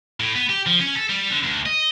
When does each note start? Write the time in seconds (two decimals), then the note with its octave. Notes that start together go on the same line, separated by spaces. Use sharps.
0.20 A2
0.35 B3
0.49 G4
0.66 F3
0.81 C#4
0.95 A4
1.09 G3
1.30 D3
1.43 D2
1.66 D#5